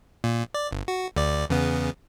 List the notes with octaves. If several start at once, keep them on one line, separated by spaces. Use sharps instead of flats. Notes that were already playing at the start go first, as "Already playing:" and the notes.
A#2
D5
G1
F#4
D2 D5
E2 C#3 B3